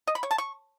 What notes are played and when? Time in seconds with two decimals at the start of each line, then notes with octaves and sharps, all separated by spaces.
0.07 D#5
0.15 B5
0.23 C#5
0.31 A5
0.38 C#6